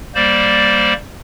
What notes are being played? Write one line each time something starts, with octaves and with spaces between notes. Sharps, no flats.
G3 A#3 C5 D5